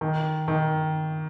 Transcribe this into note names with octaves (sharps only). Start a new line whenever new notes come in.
D#3
D#3